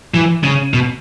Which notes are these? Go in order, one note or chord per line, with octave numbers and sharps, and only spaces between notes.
E3
C#3
B2